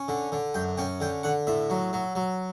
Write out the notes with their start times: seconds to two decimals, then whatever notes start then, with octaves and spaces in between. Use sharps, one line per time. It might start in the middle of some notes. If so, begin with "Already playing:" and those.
Already playing: C#4
0.08 D3
0.32 D3
0.54 F#2 G5
0.77 C#4 G5
1.00 D3 G5
1.23 D3 F#5
1.47 A2 E5
1.70 F#3
1.93 F#3
2.15 F#3